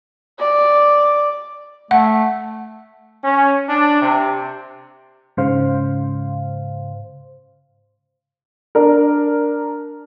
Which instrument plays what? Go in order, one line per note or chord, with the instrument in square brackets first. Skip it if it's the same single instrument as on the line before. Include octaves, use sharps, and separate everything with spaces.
[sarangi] D5
[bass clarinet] A3 [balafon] F#5
[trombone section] C#4
D4
C3
[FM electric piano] G#2 C#3 C5 F5
[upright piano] D4 A#4